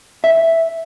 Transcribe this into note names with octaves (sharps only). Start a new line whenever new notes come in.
E5